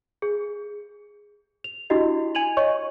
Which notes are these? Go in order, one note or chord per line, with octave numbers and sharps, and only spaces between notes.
G#4
F7
D4 E4 F#4 G4 D#5
G#5 G#6 D#7 F7 F#7
C#5 D#5 C#6